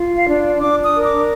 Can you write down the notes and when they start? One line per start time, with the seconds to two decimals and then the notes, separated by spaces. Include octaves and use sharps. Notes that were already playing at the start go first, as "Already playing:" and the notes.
Already playing: F4
0.16 F5
0.27 D4
0.61 D4 D6
0.84 D#6
0.95 A#4
1.05 D6